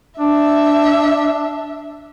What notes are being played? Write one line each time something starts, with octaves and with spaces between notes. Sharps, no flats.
D4 E5